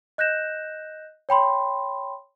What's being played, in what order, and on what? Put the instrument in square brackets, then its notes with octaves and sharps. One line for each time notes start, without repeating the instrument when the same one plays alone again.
[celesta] D#5 F#6 G6 A#6 E7
C#5 G5 B5 C6